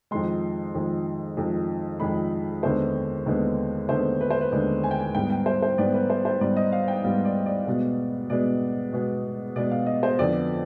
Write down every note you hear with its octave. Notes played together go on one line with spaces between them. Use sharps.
F2 D#3 G#3 C6
F2 D#3 G#3
F2 D#3 G#3
F2 D#3 G#3 B5
D#2 D3 G#3 B3 C5
D#2 D3 G#3 B3
D#2 D3 G#3 B3 C5
B4
C5
B4
D#2 D3 G#3 B3 D5
G#5
G5
G#5
G#2 G3 B3 G5
G5
C5
C5
G#2 G3 B3 D5
B4
C5
C5
G#2 G3 B3 D5
D#5
F5
G5
G#2 G3 B3 F5
D5
D5
B2 G#3 B3
B2 G#3 B3 D5
B2 G#3 B3
B2 G#3 B3 D5
F5
D#5
C5
F2 D3 F3 B3 D5